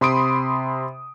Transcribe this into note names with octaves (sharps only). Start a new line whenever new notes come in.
C3 B5 C6 D#6 D7